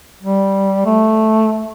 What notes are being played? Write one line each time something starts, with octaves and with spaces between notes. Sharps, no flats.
G3
A3